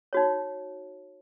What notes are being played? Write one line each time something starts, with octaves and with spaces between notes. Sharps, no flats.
D#4 F#4 C#5